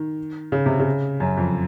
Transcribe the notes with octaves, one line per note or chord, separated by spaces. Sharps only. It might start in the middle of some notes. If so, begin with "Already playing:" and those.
Already playing: D#3
C#3
C3
C#3
F#2
F2